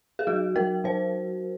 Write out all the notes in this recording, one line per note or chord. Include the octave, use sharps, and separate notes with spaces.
G#4
F#3 F#4
F#3 A#4
F#3 C5